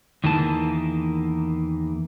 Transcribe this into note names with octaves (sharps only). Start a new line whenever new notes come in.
E2 D#3 E3 A#3 A5